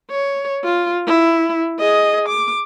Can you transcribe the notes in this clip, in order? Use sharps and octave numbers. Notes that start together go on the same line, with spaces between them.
C#5
F4
E4
G#4 D#5
D6